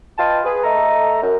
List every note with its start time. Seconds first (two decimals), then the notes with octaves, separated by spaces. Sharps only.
0.18 F4 B4 D#5 G5 A5
0.44 G#4 B4
0.63 A3 A4 D#5 A#5
1.22 F#2